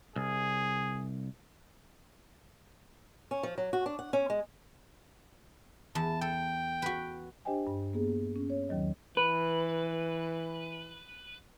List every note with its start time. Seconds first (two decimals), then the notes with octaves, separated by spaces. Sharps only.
0.16 C2 G#4
3.31 C#4
3.43 F3
3.58 F#3
3.73 F#4
3.86 D4
3.99 F#5
4.13 C#4
4.30 G#3
5.95 E2 A5
6.21 A4 G5
6.82 F#4 B4
7.45 D4 G4 C5 D#5 G5 G#5
7.67 G2
7.93 A#3 B3 G#4
8.36 C#4
8.50 C#5
8.69 D#2 D#3 F#3 D#5
9.17 E3 B4